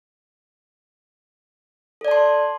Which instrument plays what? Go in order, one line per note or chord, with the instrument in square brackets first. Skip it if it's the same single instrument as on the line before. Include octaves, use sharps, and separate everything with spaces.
[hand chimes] A4
D5
A5
C6